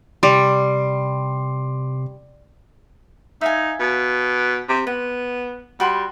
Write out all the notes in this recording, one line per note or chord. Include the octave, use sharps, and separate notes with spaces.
C3 G3 C6 D6
D#4 E5 F5 G#5
B2
C3
B3 F#5
G3 F#4 B5 C6